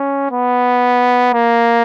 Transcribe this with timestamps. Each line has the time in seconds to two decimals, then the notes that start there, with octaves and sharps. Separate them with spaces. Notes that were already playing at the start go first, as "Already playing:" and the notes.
Already playing: C#4
0.31 B3
1.34 A#3